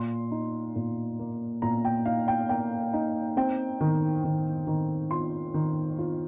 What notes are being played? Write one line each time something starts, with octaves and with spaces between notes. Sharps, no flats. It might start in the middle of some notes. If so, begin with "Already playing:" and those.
Already playing: A#2 C6
D#4
A#2
A#3
A#2 A#5
G5
D#4 F5
G5
A#3 G5
D#4
C4 G5
D#3
D#3
D#3
F4 C6
D#3
F4